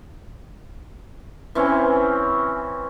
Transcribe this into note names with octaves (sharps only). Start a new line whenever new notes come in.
E3 C4 C#4